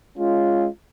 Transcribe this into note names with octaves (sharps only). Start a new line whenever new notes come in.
G#3 C#4 F4